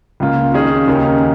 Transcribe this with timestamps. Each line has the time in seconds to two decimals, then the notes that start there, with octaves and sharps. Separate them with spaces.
0.20 C#2 C#3 A#3 F4
0.54 D#3 C#4 G#4
0.87 D#2 C#3 A#3 D#4 A#4